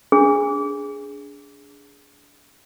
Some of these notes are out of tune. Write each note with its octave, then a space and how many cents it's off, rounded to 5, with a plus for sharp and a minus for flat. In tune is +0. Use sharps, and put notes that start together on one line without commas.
D4 -25 G#4 +0